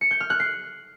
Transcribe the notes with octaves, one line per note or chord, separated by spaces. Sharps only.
C#7
G6
F6
F#6
C7